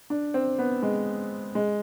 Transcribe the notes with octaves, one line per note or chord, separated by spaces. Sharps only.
D4
C4
B3
G#3
G#3